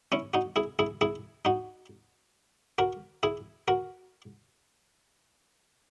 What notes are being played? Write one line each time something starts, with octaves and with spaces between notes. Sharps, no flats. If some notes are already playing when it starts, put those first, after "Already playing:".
C#4 E4
D#4 F#4
E4 G#4
E4 G#4
E4 G#4
D#4 F#4
F#4 A#4
E4 G#4
F#4 A#4